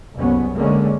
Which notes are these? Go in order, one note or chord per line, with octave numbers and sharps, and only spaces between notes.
F#1 C2 B3 C#4
D3 G#3 A#3 C#4